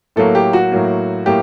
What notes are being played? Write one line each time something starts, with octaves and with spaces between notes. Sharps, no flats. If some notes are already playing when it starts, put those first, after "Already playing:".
A2 F#3 A#3 A4
G4
F#4
A2 F#3 A#3
A2 F#3 A#3 G4